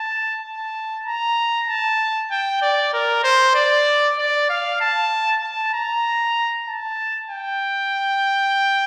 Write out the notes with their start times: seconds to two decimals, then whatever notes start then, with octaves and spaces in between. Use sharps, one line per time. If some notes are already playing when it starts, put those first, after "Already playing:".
Already playing: A5
0.43 A5
1.06 A#5
1.68 A5
2.31 G5
2.62 D5
2.93 A#4
3.24 C5
3.55 D5
4.18 D5
4.49 F5
4.80 A5
5.42 A5
5.74 A#5
6.68 A5
7.30 G5